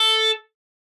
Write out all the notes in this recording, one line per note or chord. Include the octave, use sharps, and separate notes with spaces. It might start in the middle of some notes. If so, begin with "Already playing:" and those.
Already playing: A4